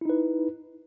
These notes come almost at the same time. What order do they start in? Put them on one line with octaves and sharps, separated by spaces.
E4 D#4 B4